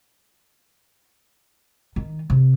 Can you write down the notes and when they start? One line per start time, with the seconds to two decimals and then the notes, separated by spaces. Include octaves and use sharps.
1.96 D#3
2.30 C3